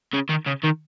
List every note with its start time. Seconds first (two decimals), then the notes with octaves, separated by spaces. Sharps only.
0.13 C#3
0.29 D#3
0.46 C#3
0.63 D#3